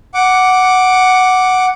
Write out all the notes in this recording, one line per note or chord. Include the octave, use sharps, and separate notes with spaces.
F#5 D6